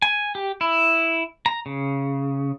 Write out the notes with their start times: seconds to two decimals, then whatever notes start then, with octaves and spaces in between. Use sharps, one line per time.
0.02 G#5
0.35 G4
0.61 E4
1.46 A#5
1.66 C#3